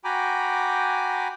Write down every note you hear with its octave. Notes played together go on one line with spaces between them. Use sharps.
F#4 G5 G#5 A#5 B5 D6